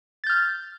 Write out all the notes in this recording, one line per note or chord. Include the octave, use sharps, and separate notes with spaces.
F6 G6 A6